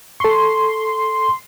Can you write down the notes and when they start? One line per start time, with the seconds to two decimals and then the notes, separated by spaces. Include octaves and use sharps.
0.20 A4 C6 C#6